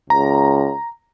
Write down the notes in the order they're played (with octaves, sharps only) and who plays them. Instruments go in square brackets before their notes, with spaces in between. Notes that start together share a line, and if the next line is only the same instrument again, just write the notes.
[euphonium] C#2 [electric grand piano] A#5